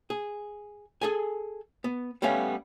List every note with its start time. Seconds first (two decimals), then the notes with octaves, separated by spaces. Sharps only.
0.10 G#4
1.01 G#4 A4 G#5
1.84 B3
2.22 G3 A3 B3 C#4 F5